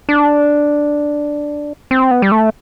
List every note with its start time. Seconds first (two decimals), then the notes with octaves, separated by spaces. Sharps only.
0.09 D4
1.91 C4
2.11 B3
2.22 G3
2.32 A3